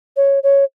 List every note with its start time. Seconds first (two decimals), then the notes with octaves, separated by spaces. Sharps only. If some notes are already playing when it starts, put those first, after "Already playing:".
0.17 C#5
0.43 C#5